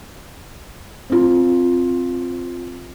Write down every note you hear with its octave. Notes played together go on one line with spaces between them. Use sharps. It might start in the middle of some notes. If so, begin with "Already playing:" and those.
C4 F4